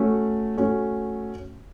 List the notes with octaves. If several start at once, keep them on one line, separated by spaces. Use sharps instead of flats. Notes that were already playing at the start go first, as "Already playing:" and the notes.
Already playing: A3 C#4 F#4
A3 C#4 F#4